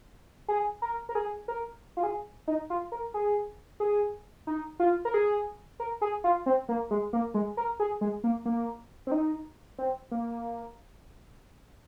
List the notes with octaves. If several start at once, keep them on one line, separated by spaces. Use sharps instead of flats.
G#4
A#4
A#4
G#4
A#4
F4
G#4
D#4
F4
A#4
G#4
G#4
D#4
F4
A#4
G#4
A#4
G#4
F4
C4
A#3
G#3
A#3
G#3
A#4
G#4
G#3
A#3
A#3
C4
D#4
C4
A#3